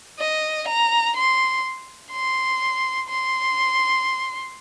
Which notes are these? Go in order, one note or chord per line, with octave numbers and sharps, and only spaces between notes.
D#5
A#5
C6
C6
C6